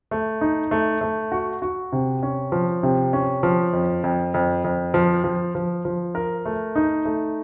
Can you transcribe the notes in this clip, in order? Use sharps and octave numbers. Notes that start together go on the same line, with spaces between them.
A3
D#4
A3
A3
F#4
F#4
C3
C#4
F3
C3
C#4
F3
F2
F2
F2
F2
F3
F3
F3
F3
A#4
A3
D#4
A3